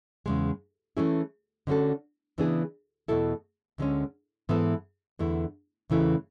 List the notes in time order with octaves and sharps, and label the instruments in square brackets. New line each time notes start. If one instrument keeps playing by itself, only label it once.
[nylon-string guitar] E2 C#3 G#3
E3 A3 C#4 E4 G#4
D3 A3 C#4 F#4 A4
C#3 E3 B3 D4 G#4
E2 B2 A3 E4 A4
D2 D3 G#3 C#4
G#2 E3 B3 E4 A4
E2 D3 A3 E4
E2 C#3 E3 A3 E4